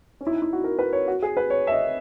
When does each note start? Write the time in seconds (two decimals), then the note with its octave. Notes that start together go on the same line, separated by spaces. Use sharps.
0.21 C#4
0.27 E4
0.31 D#4
0.42 E4
0.53 F#4
0.64 A#4
0.79 B4
0.93 C#5
1.08 F#4
1.22 G#4
1.37 B4
1.50 C#5
1.67 E5
1.72 D#5